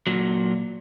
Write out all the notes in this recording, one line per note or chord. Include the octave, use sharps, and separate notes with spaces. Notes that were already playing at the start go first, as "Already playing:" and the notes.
A#2 F#3